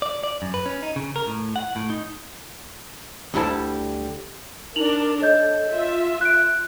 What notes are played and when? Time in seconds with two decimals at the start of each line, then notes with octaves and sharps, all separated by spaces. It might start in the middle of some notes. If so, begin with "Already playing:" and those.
0.02 D5
0.24 D5
0.42 F#2
0.54 B4
0.66 C#4
0.83 D#4
0.96 C#3
1.16 A#4
1.27 A2
1.56 F#5
1.76 A2
1.90 D#4
3.34 D2 D3 G3 E4 A5
4.76 D4 D#4 A#4 F7 F#7
5.21 A4 C#5 D#5 G6
5.71 F4 E5
6.21 F#6 D7